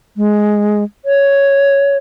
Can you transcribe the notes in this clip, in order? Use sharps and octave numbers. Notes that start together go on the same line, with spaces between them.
G#3
C#5